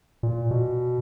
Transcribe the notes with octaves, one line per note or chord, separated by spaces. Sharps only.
A#2
B2